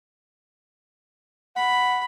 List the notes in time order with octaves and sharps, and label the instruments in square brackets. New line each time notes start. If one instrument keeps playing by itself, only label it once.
[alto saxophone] F#5 [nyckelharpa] B5